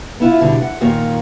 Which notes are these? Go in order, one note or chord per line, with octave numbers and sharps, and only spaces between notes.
B3 E4 F4
B2 D3 G3
F#5
A#2 D#3 A#3 F4 C#5